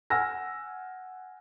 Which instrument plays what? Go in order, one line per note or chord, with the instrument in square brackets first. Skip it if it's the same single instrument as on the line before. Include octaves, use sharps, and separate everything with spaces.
[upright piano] F#5 G#5 E6 F6 A#6